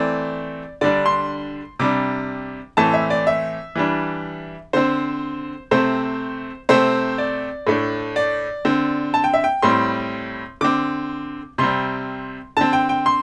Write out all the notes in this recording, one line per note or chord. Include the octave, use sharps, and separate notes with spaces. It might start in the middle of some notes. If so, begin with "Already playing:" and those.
Already playing: E3 A3 C4 D5
D3 G3 D4 D5
C6
C3 G3 D4 D6
A2 E3 A3 C4 A5
E5
D5
E5
E3 G3 D4
D3 C4 C5
C3 A3 C4 C5
C3 A3 C4 C5
D5
A2 A3 D4
D5
D3 C4
A5
G5
E5
G5
A2 G3 C4 C6
D3 C4 D6
C3 G3 C4 C6
D3 C4 A5
G5
G5
C6